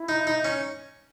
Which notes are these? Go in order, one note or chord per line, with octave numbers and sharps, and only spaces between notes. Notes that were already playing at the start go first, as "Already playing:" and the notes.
Already playing: E4
D#4
D#4
C#4